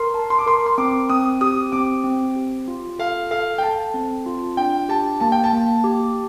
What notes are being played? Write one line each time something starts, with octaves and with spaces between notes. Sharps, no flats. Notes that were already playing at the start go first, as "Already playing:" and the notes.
Already playing: A#4 C6
A5
C6
D6
A#4 C6
C6
C4 D6
C4 D#6
G4 D#6
C4 D6
C4
G4
F4
A4 F5
A4 F5
G5
A4 A5
C4
F4
D4 G5
G4 A5
A#3 A5
G5
A5
A#3
G4